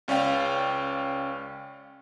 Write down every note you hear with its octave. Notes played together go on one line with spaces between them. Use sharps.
C#2 C#4 D5 F5 G5